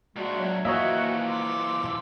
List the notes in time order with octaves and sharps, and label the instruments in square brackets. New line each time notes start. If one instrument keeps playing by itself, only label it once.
[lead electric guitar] A#2 D4 [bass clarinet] G#3 [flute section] F#4 E5 C#6
[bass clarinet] F#3
[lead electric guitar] E3 F3 [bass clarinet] A#3 [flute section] F#4 G#5 [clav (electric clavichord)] C#5 D#5 E5
[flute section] C6 D6 E6